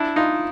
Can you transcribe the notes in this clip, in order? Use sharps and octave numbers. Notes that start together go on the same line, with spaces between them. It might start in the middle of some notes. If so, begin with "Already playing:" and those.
Already playing: D4 E4
D#4 F4